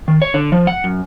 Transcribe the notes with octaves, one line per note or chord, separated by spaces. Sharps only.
D#3
C#5
D3
F3
F#5
F#2